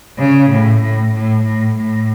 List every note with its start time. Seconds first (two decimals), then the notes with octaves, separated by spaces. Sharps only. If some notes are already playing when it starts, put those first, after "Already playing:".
0.19 C#3
0.49 A2
0.82 A2
1.13 A2
1.44 A2
1.75 A2